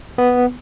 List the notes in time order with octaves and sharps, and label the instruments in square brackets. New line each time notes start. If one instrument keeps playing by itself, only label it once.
[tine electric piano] B3